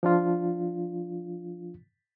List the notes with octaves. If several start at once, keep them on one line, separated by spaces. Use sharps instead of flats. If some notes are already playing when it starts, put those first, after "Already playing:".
F3 D4 F4